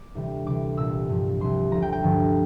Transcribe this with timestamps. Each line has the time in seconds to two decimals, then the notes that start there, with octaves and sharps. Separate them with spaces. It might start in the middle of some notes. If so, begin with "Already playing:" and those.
Already playing: D6
0.15 D2 C3 E3 G3
0.45 D2 C3 E3 G3 D6
0.77 C2 A#2 G3 E6
1.09 G2 F3
1.40 C2 C3 G3 C6
1.71 D2 C3 F3 A#5
1.82 G5
1.93 G5
2.03 G2 D3 F3